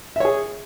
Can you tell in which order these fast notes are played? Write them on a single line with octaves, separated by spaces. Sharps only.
E5 C#5 G#4